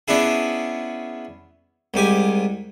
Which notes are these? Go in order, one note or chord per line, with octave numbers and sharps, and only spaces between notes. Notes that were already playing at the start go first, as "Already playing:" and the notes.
B3 C#4 D4 E4 G#4
C2 G#2 G4 G#5